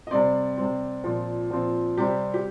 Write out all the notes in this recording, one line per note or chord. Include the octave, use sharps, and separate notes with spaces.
D#5
C3 G3 C4 D5
C3 G3 C4
A#2 F3 C4
A#2 F3 C4
C3 G3 C4 G4
G4